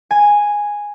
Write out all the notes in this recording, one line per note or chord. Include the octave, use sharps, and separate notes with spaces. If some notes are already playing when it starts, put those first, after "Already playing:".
G#5